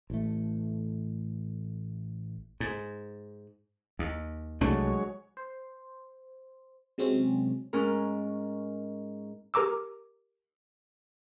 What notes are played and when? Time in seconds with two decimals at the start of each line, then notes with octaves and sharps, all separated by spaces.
0.10 A1 A3
2.60 G#2
3.99 D#2
4.61 C2 F#3 G#3 A3 D4 C#5
5.37 C5
6.98 C3 F#3 G#3 C4 C#4
7.73 G#2 C#4 A#4
9.54 G4 A#4 A#5 D6 E6